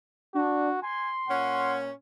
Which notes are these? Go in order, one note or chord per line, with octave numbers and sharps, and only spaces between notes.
D4 F#4
G#5 C6
A#2 C#4 F#5